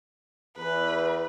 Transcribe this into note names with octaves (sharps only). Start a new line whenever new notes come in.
E2 B4